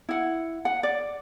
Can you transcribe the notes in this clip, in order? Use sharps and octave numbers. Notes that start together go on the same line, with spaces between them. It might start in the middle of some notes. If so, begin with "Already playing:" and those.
E4 F#5
F#5
D5